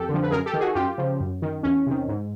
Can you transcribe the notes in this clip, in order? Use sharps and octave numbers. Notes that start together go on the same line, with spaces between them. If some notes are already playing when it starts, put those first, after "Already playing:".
Already playing: F2 G4 A4
D3 F3
B4
F#2 G#4 A#4
G4 A4
D#3
F#4 G#4
F#2 F4 G4
C#3 F3
F#2
D#3
E2 C#4
C3 D#3
G#2